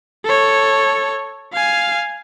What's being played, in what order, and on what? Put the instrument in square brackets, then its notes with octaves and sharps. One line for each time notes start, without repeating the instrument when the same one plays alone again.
[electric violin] A4 C#5
F5 G#5